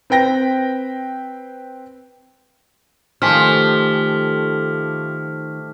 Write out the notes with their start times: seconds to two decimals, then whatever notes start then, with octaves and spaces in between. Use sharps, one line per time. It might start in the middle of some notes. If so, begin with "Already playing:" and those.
0.10 C4 B4 G5 A#6
3.22 D#3 F3 A3 G4 G#5 F6 B6